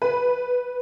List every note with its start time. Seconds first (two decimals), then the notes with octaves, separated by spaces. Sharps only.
0.02 B4